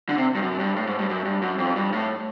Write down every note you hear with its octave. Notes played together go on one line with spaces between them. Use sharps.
D3
C3
G2
F#2
G2
A2
G#2
G2
F#2
G2
F#2
F2
G2
A2